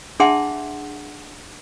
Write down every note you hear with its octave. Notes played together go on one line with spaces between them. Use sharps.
D4 G#4 E5 F#5 A5 C6